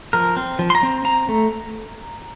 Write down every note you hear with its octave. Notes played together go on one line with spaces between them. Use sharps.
F3 A#4
C4
F3
C6
A#5
C4
C4 A#5
A3